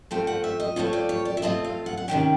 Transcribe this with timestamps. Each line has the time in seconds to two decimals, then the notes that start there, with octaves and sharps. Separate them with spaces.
0.11 F3 A3 C4 F4 G5
0.27 F#5
0.44 E5
0.60 D#5
0.76 F3 A3 C4 F4 C#5
0.93 D5
1.09 C#5
1.25 D5
1.37 E5
1.42 F3 A3 C4 F4 D#5
1.65 F5
1.86 F#5
1.97 F#5
2.08 C3 D#3 G#3 C#4 G5